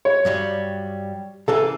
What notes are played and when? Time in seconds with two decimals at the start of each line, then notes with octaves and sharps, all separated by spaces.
0.05 C#5
0.25 G2 F#3 G3
1.48 C#3 E3 A#3 A4